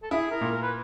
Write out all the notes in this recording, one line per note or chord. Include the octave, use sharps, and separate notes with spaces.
A4
E4 G#4
A#4
A#2
A#4
B4